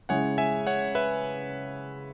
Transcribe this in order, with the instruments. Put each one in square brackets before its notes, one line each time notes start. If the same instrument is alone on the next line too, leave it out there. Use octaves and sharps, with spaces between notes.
[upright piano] C#3 G#3 C#4 E4 G#4 [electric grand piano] C#5 F#5
[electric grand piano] E5 G#5
C#5 F#5
B4 E5